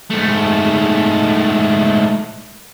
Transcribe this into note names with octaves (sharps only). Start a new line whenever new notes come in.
G#2 A3